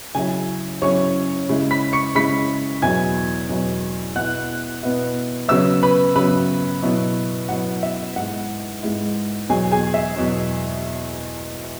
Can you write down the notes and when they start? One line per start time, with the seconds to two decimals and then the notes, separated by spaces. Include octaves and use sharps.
0.15 C#3 F#3 C#4 E4 G#4 G#5
0.82 C#3 F#3 C#4 E4 C#5 C#6
1.49 C#3 G#3 E4
1.71 B5 B6
1.93 C#6 C#7
2.15 C#3 G#3 E4 B5 B6
2.82 E2 B2 F#3 B3 E4 G#5 G#6
3.49 E2 B2 F#3 B3 E4
4.15 B2 B3 E4 F#5 F#6
4.83 B2 B3 E4
5.48 C#3 F#3 B3 E5 E6
5.83 B4 B5
6.16 C#3 F#3 B3 B4 B5
6.82 B2 F#3 B3 E4
7.49 B2 F#3 B3 E4 F#5
7.83 E5
8.16 G#2 G#3 E4 F#5
8.83 G#2 G#3 E4
9.49 E2 B2 F#3 G#4 G#5
9.71 G#4 G#5
9.94 E5
10.16 E2 B2 F#3